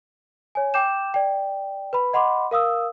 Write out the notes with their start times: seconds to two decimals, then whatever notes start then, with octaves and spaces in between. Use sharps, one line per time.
0.55 C#5 G#5
0.74 G5 D6 G6 E7
1.14 D5 G5
1.93 B4 B5
2.13 D#5 F#5 B5 C6 D6
2.51 A#4 F5 D#6 E6